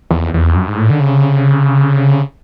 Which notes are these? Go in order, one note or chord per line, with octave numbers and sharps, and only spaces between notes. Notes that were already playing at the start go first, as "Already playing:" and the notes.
E2
E2
F#2
G#2
A2
D3
C#3